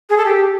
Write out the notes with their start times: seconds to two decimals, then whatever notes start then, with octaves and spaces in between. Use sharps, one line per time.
0.10 G#4
0.17 A4
0.25 G4